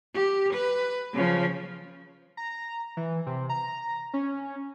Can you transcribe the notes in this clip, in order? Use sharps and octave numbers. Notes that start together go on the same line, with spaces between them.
G4
B4
C#3 F3
A#5
E3
C3
A#5
C#4